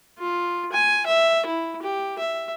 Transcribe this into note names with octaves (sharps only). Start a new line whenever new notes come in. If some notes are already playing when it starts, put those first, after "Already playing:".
F4
G#5
E5
E4
G4
E5